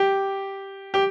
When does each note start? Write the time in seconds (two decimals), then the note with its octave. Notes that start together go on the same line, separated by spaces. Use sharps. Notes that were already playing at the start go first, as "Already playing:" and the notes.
Already playing: G4
0.94 G4